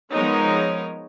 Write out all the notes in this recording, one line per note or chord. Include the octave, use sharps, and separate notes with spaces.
F3 G#3 B3 D#4 A#4 C#5